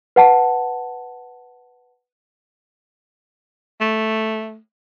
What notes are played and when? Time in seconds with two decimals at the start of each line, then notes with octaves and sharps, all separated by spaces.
0.16 B4 F#5 A5
3.81 A3